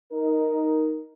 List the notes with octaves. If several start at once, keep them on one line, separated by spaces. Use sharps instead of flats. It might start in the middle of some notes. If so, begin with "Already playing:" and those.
D#4 A#4